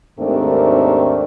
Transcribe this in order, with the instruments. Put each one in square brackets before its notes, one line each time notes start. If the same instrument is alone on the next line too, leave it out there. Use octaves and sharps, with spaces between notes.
[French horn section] D#2 G#2 A3 C4 D4 A#4